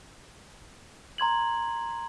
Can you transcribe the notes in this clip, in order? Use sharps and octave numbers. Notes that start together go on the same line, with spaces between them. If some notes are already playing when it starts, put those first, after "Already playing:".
A#5 C6 G#6 F#7